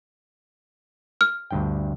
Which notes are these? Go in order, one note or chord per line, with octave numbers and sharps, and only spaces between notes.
F6
D2 G2 G5